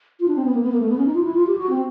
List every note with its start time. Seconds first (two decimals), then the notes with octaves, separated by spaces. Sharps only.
0.20 F4
0.28 D4
0.36 C4
0.45 B3
0.54 A#3
0.62 B3
0.72 A#3
0.80 A3
0.88 B3
0.98 C#4
1.06 D#4
1.14 F4
1.23 E4
1.34 F4
1.47 G4
1.58 F#4
1.70 C4